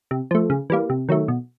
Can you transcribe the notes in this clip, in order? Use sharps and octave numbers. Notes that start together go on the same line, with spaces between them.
C3
F3 A3
C#3
E3 G3 A#3
C3
D#3 F#3 A3
B2